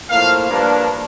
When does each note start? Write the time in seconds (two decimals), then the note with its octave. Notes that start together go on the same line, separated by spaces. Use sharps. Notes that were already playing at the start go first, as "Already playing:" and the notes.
0.10 A2 F3 A#3 F5
0.48 G2 F3 A#3 D4